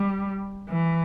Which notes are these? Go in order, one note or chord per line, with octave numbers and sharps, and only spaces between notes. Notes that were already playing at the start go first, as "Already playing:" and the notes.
Already playing: G3
E3